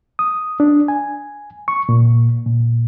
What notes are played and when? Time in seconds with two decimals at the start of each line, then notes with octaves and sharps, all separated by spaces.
0.19 D#6
0.60 D4
0.88 G#5
1.68 C#6
1.89 A#2
2.47 A#2